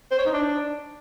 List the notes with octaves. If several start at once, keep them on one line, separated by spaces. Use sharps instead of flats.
C5
C#5
D#4
D4